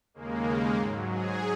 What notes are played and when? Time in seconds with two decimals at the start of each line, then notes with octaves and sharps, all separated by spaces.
0.14 D#2 C#3 G#3 A#3
0.77 G#2 F#3
1.08 G#4